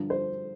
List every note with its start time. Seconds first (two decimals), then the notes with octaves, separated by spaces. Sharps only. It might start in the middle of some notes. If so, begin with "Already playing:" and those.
Already playing: G2 D3 F3 D4
0.10 C5